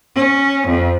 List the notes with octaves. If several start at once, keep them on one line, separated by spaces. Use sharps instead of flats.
C#4
F2